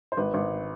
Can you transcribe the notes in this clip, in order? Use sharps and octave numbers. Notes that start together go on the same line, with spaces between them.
C5
G#1 B4
G#1